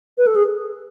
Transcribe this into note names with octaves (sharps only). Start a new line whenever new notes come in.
B4
A4
G#4